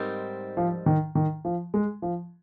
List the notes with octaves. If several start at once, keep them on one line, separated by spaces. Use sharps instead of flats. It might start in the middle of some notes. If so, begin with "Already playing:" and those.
Already playing: G#2 G3 C4 D#4 A#4
F3
D#3
D#3
F3
G#3
F3